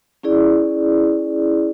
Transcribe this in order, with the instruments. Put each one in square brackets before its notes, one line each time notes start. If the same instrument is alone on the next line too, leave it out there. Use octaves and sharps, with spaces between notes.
[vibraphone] C#4 E4 G#4 D5